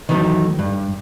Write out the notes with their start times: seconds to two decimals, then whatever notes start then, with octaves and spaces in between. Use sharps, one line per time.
0.09 D#3 E3 F#3 A3 D#4
0.59 G2